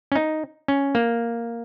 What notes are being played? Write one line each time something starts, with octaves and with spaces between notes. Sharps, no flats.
C#4
D#4
C#4
A#3